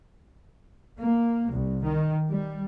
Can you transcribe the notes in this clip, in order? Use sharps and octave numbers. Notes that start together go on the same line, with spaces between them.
A#3
C2
D#3
G3